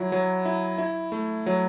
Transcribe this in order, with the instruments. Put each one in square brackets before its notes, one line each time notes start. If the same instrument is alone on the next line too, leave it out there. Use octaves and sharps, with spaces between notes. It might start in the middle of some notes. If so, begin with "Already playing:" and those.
Already playing: [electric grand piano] F#3 E4
F#3
E4
E4
A3
F#3